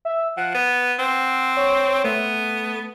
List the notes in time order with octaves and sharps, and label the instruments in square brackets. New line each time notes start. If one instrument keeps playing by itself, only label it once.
[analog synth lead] E5
[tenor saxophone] F3 [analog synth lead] F#5
[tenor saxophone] B3
C4
[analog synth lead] C#5
[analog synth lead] A3 [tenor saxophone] B3